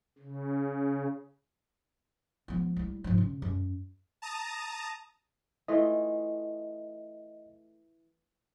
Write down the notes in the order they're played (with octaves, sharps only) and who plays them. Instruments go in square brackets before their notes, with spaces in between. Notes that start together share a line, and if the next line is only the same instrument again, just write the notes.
[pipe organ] C#3
[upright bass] F3 B3
G3 E4
G#2 F3
C#3
F#2
[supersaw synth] A5 A#5 D#6
[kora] E3 A3 F4 [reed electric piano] D#5